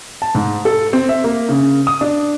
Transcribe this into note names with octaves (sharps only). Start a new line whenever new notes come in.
A5
G#2
A4
C4
E5
A#3
C#3
D#6
D4